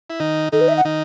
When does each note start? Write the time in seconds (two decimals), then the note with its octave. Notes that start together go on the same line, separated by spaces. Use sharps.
0.10 E4
0.20 D#3 D#4
0.52 D#3 D#4 A4
0.61 B4
0.68 E5
0.77 F#5
0.85 D#3 D#4